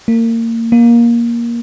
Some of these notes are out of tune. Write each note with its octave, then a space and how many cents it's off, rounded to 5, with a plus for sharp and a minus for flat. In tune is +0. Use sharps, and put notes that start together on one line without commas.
A#3 -30
A#3 +15